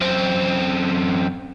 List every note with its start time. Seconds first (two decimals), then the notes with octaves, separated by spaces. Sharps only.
0.01 F#2 C4